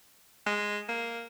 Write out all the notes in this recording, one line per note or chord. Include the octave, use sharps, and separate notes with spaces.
G#3
A#3